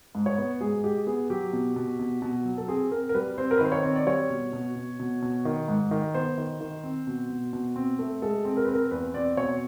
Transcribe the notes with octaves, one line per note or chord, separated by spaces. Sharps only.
G#2
C#5
B3
G#2 G#4
G#3 G4
B3 G#4
F#3 G4
B2
B2
B2
B2
F#3
A4
C4 G#4
C4 A#4
A#4
G3 B4
C4 C5
A#4
B4
D#3 C5
C#5
C4
D5
G3 C#5
B2
B2
B2
B2
B2
D#3
G#2
D#3
B3 C5
D#3
D#3
C4
B2
B2
B2
C4
A3
G#3 A4
C4
A#4
B4
C4
A#4
E2 B4
C4 D5
B2 C#5